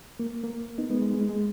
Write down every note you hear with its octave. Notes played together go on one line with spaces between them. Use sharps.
A#3
A#3
B3 D#4
G#3 B3
G#3
G#3
G#3